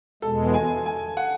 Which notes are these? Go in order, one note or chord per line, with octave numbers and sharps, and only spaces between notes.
E2 B2 G#3 A4
G#5
G#5
F#5